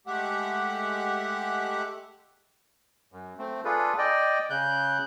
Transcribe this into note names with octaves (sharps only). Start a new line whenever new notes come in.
G#3 A3 G4 E5 F#5
F#2
A3 C4
D4 F4 G#4 A4 B4
D5 D#5 G5
C#3 F#6 G6